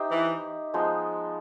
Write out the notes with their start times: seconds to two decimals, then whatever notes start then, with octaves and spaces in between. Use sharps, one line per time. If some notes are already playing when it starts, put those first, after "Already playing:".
Already playing: D#4 G4 C5 E5
0.11 E3
0.74 F3 G#3 B3 D#4